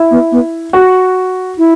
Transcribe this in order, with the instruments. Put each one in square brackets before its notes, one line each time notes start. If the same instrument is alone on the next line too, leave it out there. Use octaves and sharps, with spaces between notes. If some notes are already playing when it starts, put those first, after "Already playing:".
Already playing: [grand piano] E4
[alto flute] B3
B3
[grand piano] F#4
[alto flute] E4